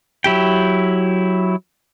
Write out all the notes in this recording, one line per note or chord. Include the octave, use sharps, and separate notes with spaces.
F#3 E4 G4 G5